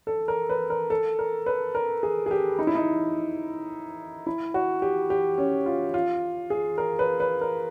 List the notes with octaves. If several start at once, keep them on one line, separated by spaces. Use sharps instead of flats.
A4
A#4
B4
A#4
A4
A#4
B4
A#4
G#4
G#4
G4
D#4
E4
D#4
E4
F#4
G4
G4
C#4
F4
F4
G#4
A#4
B4
B4
A#4